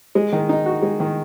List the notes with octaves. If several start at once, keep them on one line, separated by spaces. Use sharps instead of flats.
G#3
D#3
D#4
F#4
G#3
D#3